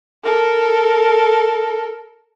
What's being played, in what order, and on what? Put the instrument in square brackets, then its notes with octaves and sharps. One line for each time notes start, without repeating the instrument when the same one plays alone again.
[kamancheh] A4 A#4